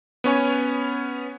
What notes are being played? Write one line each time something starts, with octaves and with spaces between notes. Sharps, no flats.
B3 C#4 C#5 G#5